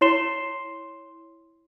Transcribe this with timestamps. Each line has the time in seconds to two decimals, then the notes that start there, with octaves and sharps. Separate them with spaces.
0.01 E4 C#5 C6 C7 E7 G7